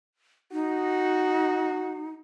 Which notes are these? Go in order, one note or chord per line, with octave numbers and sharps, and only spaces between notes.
D#4 F#4